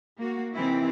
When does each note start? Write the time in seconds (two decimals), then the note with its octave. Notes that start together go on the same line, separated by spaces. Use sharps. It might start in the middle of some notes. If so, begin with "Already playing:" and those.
0.18 A#3 F#4
0.54 C3 D#3 E3 C4 E4